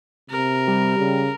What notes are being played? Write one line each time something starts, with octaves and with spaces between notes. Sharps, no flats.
C3 A#4
G3
C#3